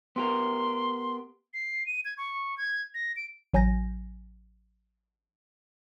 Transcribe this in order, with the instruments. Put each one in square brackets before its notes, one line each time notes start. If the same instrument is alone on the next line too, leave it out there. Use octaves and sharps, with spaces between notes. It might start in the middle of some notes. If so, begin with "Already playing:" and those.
[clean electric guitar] B3 G4 A#4 [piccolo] C6
[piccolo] C7
D#7
G#6
C#6
G#6
A#6
D7
[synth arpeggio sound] A1 F#3 G#5 G6 A#6